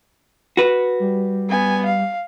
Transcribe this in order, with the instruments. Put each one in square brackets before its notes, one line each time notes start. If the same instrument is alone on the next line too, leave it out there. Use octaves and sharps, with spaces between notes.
[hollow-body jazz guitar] F#4 B4
[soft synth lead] G3
[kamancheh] B3 G#5
F5